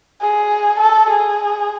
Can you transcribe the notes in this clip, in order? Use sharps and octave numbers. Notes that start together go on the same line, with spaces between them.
G#4
A4
G#4